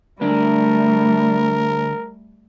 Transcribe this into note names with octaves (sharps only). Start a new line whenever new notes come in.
D2 G3 A3 D4 A#4